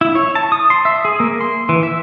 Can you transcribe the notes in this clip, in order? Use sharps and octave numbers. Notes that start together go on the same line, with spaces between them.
E4
C#5
A5
D#6
C6
E5
G#4
A#3
C6
E3
E5